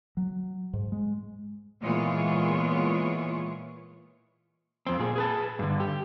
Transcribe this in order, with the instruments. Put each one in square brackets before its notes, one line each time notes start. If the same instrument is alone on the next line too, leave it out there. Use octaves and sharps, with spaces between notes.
[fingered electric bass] F#3
G#2
G#3
[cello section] A#2 E3 G#3 B3 F4 C#5
[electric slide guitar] F2 C4
A#2 G#4
G#4 B4 A5
G2 D3
G4